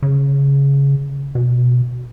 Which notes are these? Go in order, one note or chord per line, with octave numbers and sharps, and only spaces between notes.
C#3
B2